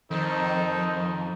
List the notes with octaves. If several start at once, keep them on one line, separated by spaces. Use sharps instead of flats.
F2 D#3 D#4 A4 C5 A5